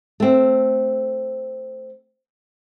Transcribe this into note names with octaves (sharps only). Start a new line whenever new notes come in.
A3 C4